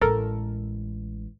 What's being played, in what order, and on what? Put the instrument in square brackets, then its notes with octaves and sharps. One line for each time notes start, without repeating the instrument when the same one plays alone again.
[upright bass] A1 G#3 [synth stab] A4 A#4